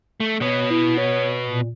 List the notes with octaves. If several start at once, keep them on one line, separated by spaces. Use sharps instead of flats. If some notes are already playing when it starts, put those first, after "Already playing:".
A3
B2 B3 C#5
E4
C#5
A#2